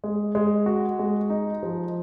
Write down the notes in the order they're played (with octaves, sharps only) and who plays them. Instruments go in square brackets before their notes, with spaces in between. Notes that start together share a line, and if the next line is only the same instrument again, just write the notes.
[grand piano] G#3
G#3
F#4
G#3
D#4
F3